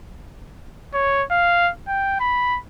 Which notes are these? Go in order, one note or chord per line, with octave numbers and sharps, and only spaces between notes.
C#5
F5
G5
B5